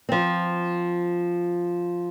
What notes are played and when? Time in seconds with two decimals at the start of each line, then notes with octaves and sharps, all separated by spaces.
0.09 F3 C4